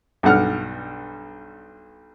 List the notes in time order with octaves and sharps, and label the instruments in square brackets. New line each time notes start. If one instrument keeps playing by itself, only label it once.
[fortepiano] B1 G2 F#5 F6